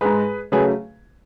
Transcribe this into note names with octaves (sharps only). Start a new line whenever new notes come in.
G#2 G#3 G#4 B4
C#3 F#3 A3 G#4 B4